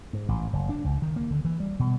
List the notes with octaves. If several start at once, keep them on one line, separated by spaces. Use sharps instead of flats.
G#2
A1
F#1
D4
C#2
D#3
A#3
D3
E3
G3
B2